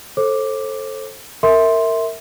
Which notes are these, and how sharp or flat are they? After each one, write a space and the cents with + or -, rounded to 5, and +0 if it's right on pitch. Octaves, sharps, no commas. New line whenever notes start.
A4 +0 C5 +30 D6 +0
A#4 -20 E5 -15 C6 +0